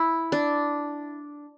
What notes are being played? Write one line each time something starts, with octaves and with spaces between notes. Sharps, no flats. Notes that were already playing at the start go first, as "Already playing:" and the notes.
Already playing: E4
D4